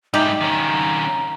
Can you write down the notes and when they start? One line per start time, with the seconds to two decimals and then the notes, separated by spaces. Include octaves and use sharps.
0.14 G#2 G3 D#4 G4 E5
0.41 D#3 C#4 A#5